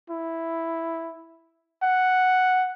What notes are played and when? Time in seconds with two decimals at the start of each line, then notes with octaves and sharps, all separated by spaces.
0.10 E4
1.83 F#5